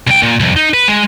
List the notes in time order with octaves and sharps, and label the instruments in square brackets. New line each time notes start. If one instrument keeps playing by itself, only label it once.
[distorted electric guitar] C2 G5
A#2
C2 F2
D#4
B4
G#3